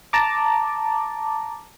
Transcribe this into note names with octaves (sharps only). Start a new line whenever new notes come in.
A5 A#5 D6